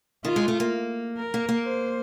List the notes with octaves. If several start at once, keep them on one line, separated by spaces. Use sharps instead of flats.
D#3 F4
G#3
A3
A#3
A#4
A#3
A#3
C5